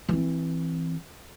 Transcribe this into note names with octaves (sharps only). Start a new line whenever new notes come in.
E3 C4